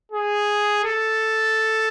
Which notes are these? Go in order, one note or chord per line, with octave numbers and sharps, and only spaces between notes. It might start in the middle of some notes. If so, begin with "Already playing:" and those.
G#4
A4